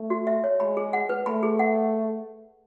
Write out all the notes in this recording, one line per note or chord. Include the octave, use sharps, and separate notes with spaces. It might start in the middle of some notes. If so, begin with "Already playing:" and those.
Already playing: A3
F#4
E5
C#5
G#3 B5
G#4
F#5
B4
A3 B5
G#4
F#5